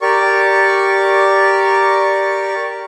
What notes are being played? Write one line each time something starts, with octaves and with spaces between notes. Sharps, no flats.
G4 A#4 D5 C#6